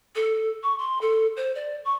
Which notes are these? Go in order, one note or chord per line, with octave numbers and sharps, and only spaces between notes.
A4
C#6
C6
A4
C5
D5
C#6